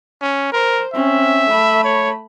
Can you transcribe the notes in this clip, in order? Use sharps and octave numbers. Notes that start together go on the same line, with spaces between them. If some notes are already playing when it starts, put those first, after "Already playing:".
C#4
A#4 C5
C4 C#4 E5
A3 B5
C#5